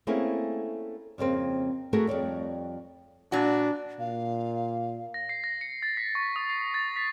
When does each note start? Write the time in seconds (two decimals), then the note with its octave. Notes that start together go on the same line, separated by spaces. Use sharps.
0.07 A3 A#3 C4 C#4 E4 G#4
1.18 F2 C#3 A#3 C4
1.93 A3 B3 F#4 G#4 A#4
2.07 F2 G3 C#5 D5
3.32 A#2 D4 F#4
4.00 A#2 F5
5.14 A#6
5.29 C7
5.44 A#6
5.61 C#7
5.82 A6
5.97 B6
6.15 C#6
6.36 D#6
6.50 C7
6.74 A6
6.96 B6